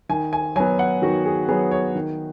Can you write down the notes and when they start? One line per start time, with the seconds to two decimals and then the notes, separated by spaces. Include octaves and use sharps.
0.09 D#3 G#5
0.33 G#5
0.56 F#3 B3 G#5
0.79 F#5
1.02 D#3 F#4
1.26 G#4
1.49 F#3 B3 G#4
1.71 C#5
1.95 D#3